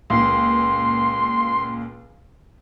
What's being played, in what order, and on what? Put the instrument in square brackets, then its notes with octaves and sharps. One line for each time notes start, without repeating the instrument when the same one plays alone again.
[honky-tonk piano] C#2 A#2 [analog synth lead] C6